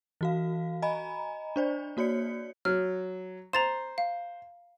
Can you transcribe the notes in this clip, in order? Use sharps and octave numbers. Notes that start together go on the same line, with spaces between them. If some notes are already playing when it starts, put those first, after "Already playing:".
E3 F#4 F5
D#5 G#5 A#5 B5
D4 C5 D5
A#3 F#4 C#5 D5 C#7
F#3 F6
C5 A#5 A6 E7
F5